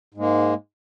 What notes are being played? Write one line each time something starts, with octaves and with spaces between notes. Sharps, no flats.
G#2 G#3 A#3